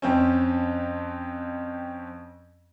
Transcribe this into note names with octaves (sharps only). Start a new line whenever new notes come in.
F2 C4 C#4